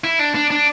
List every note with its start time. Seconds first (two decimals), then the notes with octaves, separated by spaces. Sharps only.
0.04 E4
0.19 D4
0.35 D4
0.51 D4